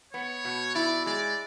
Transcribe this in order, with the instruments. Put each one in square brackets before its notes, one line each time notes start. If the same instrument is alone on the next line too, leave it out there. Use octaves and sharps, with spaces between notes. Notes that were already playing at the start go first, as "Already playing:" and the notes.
[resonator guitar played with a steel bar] B3 [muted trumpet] C#5
[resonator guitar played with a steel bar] B2
[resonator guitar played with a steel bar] E4 [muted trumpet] D5
[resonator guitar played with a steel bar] G#3 [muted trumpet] D5